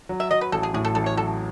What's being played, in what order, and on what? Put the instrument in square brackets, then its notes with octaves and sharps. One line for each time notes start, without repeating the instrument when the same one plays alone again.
[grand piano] F#3
[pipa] E5
[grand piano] F#3 [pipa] D#5
[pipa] B4
[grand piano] A1 [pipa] A4
[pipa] G#4
[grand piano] A2 [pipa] G#4
[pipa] A4
[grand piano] A1 [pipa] A4
[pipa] C#5
[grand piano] F#3 [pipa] A4